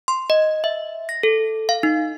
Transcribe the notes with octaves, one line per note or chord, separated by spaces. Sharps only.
C6
D#5
E5
A#6
A4
F5
D#4